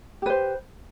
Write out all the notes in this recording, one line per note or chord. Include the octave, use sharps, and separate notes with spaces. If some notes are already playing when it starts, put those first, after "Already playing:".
G4 B4 C5